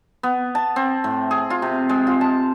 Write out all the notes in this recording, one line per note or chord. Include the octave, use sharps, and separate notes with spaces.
B3
A5
C4
A2
G#4
F4
C3
G#3
F4
A5